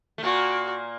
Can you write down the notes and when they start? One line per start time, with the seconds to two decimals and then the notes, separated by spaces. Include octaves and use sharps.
0.18 A3
0.23 A#2 A#3 F#4